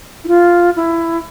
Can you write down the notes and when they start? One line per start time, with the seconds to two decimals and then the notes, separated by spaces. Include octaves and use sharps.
0.24 E4
0.28 F4
0.76 E4